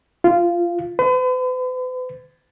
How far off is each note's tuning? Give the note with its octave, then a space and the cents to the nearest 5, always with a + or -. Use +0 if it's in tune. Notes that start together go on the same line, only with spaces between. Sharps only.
F4 -15
B4 +45